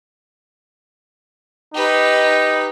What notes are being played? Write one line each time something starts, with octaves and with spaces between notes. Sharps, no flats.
D#4 G4 B4